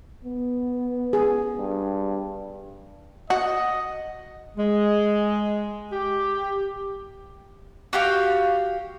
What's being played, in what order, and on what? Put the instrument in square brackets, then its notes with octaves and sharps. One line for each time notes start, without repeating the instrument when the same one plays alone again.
[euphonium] B3
[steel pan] G#4
[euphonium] G2
[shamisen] F#4 [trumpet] D#5
[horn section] G#3
G4
[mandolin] F#4 G4 F5